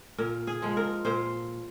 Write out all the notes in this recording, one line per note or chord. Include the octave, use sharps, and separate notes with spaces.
A#2 A#4
G#4
F3 G#3
A#4
A#2 C5